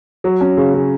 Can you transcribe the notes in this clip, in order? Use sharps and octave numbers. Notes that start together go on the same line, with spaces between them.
F#3
C#4
C#3
C#3